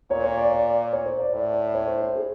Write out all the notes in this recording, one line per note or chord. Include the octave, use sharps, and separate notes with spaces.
A#2 C#5
C#5
D5
D5
C#5
C5
D5
A2 D5
D5
C#5
C5
C5
G#4